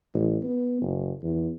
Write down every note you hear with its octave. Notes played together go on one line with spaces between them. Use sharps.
A1
B3
F#1
E2